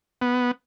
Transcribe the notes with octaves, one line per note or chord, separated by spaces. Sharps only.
B3